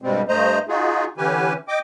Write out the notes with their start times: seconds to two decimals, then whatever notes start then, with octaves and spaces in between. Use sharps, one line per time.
0.02 G2 B2 G3 G#3 C4
0.29 G2 A3 C5 D#5 A#5
0.69 D#4 F4 F#4 G#4
1.17 D3 E3 C#4 G4 B4 G#5
1.68 D#5 G5 D6